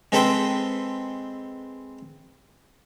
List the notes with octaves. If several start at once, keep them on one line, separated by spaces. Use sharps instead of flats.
G#3 C4 A4 B4 C5 G5